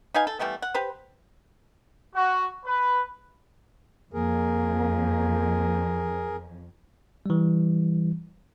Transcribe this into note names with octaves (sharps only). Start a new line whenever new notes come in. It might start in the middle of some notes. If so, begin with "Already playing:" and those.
D#4 B4 F5 G#5
A4
E3 G3 A3 B3
F#5
G4 B4 C5
F#4
B4
F2 A#3 G#4 A#4
E3 G3